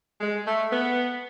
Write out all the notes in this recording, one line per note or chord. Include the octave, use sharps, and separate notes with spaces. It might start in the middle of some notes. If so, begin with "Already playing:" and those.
G#3
A3
B3